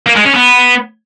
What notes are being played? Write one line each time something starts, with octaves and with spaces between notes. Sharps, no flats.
A#3
G#3
C#4
B3